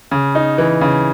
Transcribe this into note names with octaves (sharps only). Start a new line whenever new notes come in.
C#3
D#4
E3
C#3